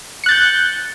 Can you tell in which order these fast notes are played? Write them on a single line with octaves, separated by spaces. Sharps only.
C#7 F#6 A6 G6